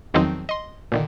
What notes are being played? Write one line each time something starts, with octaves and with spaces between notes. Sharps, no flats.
E2 D#3 F3 F#3 C4 D#4
D#5 C6
A#2 D3 D#3